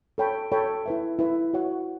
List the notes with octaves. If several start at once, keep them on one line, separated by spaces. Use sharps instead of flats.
A4 C#5 G5 B5
A4 C#5 G5 B5
E4 B4 E5
E4 B4 E5
F#4 C#5 F#5